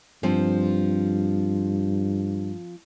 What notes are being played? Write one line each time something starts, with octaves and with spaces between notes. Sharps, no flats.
G2 F3 C4